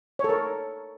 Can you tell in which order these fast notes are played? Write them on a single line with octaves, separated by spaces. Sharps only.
C#5 A4 A#4